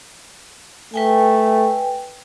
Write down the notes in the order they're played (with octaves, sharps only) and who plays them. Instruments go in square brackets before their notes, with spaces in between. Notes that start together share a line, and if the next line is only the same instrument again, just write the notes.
[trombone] A3 [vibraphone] B4 G5 G#5